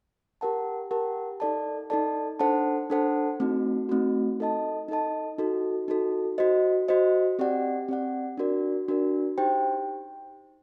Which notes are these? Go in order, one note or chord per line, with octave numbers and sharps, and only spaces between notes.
G4 A#4 F#5 A5
G4 A#4 F#5 A5
D#4 A4 D5 A5
D#4 A4 D5 A5
D4 A4 C5 F#5 A5
D4 A4 C5 F#5 A5
A3 C4 D#4 F#4
A3 C4 D#4 F#4
D#4 A4 D#5 A5
D#4 A4 D#5 A5
D#4 F#4 A4
D#4 F#4 A4
F#4 C5 D#5
F#4 C5 D#5
C4 G4 D5 F#5
C4 G4 D5 F#5
D4 F#4 A#4 D5
D4 F#4 A#4 D5
D#4 G4 C5 G5